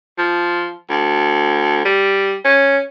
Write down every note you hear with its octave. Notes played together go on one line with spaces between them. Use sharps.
F3
D2
G3
C#4